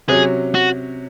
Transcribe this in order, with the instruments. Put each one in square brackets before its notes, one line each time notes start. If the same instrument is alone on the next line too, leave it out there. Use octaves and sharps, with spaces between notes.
[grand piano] C3 F#3 C#4 [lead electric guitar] G#4
[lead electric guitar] F#4